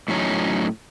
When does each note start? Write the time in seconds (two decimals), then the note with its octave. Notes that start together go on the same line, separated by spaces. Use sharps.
0.08 A2 F#3 C#4 D#4